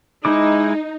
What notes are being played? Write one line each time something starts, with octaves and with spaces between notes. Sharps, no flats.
G#3 D#4 E4 D6